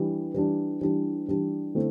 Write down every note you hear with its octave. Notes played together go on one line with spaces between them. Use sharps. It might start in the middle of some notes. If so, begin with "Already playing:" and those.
Already playing: E3 G3 D4
E3 G3 D4
E3 G3 D4
E3 G3 D4
D3 A3 C4 E4